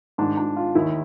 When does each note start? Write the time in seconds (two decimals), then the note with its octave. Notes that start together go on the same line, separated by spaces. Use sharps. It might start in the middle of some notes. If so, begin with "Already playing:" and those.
0.18 G#2 D#3 D4
0.37 D4
0.56 F4
0.75 D#2 D#3 E4